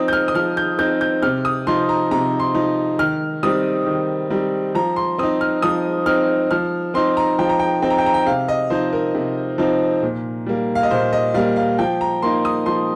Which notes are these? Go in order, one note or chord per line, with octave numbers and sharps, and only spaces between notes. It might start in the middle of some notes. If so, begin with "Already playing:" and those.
Already playing: F3 C4 D#4 D#6
G6
F6
D#6
F3 F6
G6
C4 D#4 G6
G6
C3 F6
D#6
F3 D#4 C6
A#5
C3 A#5
C6
F3 D#4
D#3 F6
G3 C4 D#4 D#6
D#3
G3 C4 D#4
F3 A#5
C6
C4 D#4 D#6
F6
F3 D#6
C4 D#4 F6
F3 F6
C4 D#4 C6
A#5
F3 G5
A#5
G5
C4 D#4 G5
A#5
G5
A#5
G5
C3 F5
D#5
F3 C4 D#4 C5
A#4
C3
F3 C4 D#4
A#2
G3 A#3
F5
D#5
A#2 C5
D#5
G3 A#3 F5
F5
F3 G5
A#5
A#3 D#4 C6
D#6
F3 C6